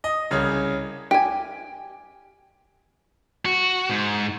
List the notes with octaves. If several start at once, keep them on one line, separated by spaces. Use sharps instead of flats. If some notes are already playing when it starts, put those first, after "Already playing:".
D#5
C2 C#3 C#4
G4 G#5
F#4
G#2